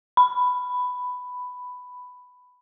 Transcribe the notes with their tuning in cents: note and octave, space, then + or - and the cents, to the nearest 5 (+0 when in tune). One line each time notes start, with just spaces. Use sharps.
B5 +10